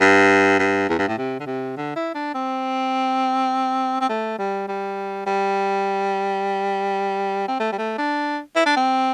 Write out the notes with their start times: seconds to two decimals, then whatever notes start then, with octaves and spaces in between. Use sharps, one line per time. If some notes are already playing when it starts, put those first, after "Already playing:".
0.01 G2
0.59 G2
0.89 E2
0.99 G2
1.08 A2
1.18 C3
1.40 D3
1.46 C3
1.77 D3
1.96 E4
2.14 D4
2.34 C4
4.01 C4
4.09 A3
4.38 G3
4.68 G3
5.26 G3
7.48 C4
7.60 A3
7.72 G3
7.78 A3
7.98 D4
8.56 E4
8.66 D4
8.76 C4